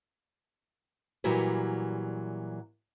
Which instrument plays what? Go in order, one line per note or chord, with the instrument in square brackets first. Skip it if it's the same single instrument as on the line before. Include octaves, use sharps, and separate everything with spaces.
[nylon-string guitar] A#2 E3 F#3 G3 B4